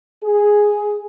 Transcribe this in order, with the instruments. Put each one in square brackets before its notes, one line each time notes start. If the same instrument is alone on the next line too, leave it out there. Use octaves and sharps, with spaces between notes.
[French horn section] G#4